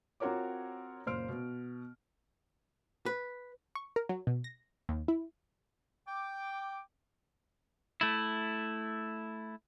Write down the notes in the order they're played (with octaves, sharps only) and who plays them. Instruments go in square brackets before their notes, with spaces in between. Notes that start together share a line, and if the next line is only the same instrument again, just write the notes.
[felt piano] C4 F4 F#4 A#4 C#5 D6
F#1 A#2 C5 C6 F6 D7
B2
[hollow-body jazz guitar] B4
[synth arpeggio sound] C#6
A#4
F#3
B2
A#6
D#2
E4
[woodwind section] G5 D6
[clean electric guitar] A3 E4